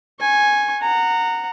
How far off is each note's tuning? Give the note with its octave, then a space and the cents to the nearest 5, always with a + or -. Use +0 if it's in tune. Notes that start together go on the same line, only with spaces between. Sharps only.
G#5 +0 C#6 -35
F#5 -5 A#5 -20